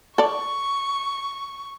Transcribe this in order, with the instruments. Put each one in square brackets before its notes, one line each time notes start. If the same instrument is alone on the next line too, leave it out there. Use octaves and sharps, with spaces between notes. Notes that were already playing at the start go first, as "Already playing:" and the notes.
[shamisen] A4 D5 [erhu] C#6